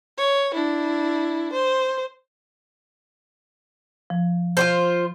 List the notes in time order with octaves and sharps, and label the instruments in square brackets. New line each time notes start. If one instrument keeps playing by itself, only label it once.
[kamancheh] C#5
D4 E4
C5
[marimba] F3
[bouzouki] F4 F#4 C5